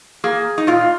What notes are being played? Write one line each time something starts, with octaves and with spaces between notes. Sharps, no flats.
A#3 G#4
D#4
A#2 F4